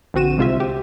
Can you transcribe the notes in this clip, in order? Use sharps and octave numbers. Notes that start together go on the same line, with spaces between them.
A#1 D3 C4 F#4 D#7 E7
C2 C3 G#3 F4 C5 E5
G4